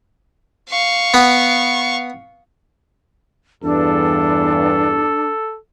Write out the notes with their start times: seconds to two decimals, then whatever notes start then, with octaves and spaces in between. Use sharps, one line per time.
0.70 F5 C#6
1.14 B3
3.64 E2 G2 D4 A4